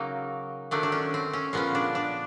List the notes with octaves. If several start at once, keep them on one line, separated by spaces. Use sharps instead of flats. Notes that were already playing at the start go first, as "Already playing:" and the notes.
Already playing: C#3 F#3 A#3 D#4
D#3 F#3 A3 D4
D4
C#4
C4
C#4
A#2 F3 G#3 B3 C#4
D4
D4